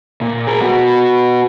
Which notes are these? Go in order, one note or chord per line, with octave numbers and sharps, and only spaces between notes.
A#2
G#4 A#4
B3 F#4